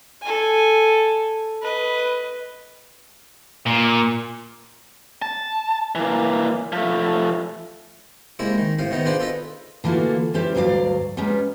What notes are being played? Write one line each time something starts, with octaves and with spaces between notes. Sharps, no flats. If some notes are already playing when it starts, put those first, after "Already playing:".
A4 G#5
B4 D#5
A#2
A5
E3 A#3
F3 A3
C3 G#3 A#3 E4
D#3
A2 C3 F5
C3 D#3 B3 D#4
D4 F4 G#4 B4 C5
F4 A4 B4 D#5
D3 E3 A3 A#3 F4 F#4
E3 G3 C#4 G4 C5 E5
D2 G2 F#3 D5 F5
G3 G#3 B3 C#4 D#4